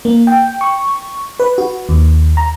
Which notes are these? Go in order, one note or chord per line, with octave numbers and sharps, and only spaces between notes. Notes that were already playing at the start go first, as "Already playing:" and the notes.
A#3
G5
C#6
B4
F#4
D#2
A#5